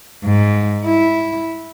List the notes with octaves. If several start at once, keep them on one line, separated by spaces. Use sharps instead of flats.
G#2
E4